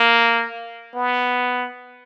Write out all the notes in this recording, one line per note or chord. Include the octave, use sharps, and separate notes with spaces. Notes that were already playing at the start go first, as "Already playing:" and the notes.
Already playing: A#3
B3